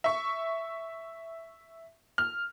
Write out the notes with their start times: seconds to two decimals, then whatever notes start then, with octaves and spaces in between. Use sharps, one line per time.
0.04 E5 C#6
2.18 F6